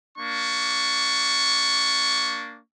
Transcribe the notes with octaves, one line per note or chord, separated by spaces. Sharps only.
A#3 D4 C#6